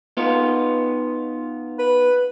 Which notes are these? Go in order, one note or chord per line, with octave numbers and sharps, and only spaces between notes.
B3 D#4 F4
B4